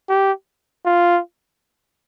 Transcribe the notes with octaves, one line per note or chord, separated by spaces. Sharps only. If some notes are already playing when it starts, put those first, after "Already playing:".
G4
F4